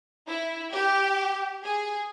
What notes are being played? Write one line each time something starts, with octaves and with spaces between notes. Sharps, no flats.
E4
G4
G#4